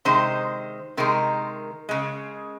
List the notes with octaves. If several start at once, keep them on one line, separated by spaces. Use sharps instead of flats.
C3 D#3 G#3 C5
C3 D#3 G#3 A#4
C#3 G#3